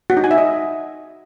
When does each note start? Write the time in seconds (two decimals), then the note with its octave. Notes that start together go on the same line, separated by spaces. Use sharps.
0.10 F#4
0.17 D#4
0.24 G#5
0.31 E5
0.38 D#5